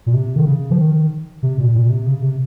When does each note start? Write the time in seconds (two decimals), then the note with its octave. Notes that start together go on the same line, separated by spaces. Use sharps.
0.06 A#2
0.13 C3
0.36 D#3
0.46 C#3
0.70 F3
0.78 D#3
1.43 C3
1.58 A#2
1.75 A#2
1.89 C3
2.06 C#3
2.21 C3